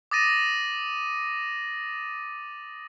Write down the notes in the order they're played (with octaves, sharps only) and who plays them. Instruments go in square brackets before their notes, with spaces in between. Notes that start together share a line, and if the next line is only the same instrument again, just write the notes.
[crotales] D6 D#6 A6 A#6 D#7